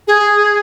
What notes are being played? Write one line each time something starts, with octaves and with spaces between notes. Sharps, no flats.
G#4